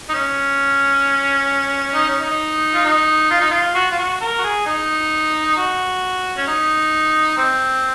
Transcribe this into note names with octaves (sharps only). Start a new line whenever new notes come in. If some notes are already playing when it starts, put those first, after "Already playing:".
D#4
C#4
D#4
C#4
D#4
F4
D#4
F4
D#4
F4
F#4
F4
F#4
A#4
F#4
G#4
D#4
F#4
C#4
D#4
C4